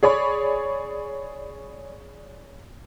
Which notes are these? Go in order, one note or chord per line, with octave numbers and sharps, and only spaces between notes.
G#4 C#5 D5 B5 C#6